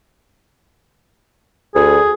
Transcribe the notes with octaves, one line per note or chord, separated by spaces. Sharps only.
D2 G#4